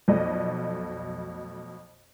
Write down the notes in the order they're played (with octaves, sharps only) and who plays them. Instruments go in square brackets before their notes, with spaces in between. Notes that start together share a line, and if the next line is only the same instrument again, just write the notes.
[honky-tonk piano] B1 F2 B2 A3 D5 D#5